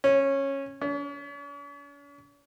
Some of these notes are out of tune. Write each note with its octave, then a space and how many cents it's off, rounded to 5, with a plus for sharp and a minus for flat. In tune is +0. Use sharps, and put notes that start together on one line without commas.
C#4 -15
C#4 +45